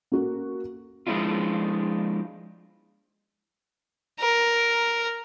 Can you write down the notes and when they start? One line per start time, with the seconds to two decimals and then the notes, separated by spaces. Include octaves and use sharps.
0.12 A#3 C#4 F#4 A4 A#4
1.07 F3 G#3 C#4 D4 E4 F4
4.20 A#4